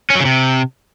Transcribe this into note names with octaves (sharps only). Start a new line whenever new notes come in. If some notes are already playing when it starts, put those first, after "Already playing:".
C#4
F#3
C#3
C3